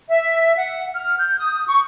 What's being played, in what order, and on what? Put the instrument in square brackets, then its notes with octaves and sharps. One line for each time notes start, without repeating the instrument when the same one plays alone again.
[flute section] E5
F#5
F6
G6
D#6
C#6